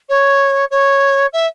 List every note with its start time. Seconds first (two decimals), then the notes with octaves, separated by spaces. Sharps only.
0.09 C#5
0.71 C#5
1.32 E5